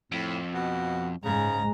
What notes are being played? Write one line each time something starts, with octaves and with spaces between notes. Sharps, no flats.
F2 A2
B2
G#2 C#3 G#3 A#5